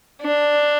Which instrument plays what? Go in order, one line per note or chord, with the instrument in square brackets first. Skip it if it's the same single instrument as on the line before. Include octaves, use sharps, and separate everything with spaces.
[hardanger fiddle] D4